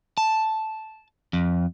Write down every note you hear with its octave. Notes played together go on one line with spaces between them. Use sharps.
A5
F2